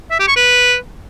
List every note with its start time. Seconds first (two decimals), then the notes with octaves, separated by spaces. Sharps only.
0.11 E5
0.19 G4
0.28 C#6
0.36 B4